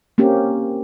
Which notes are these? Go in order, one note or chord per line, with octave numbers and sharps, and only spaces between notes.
A#3 C4 C#4 G4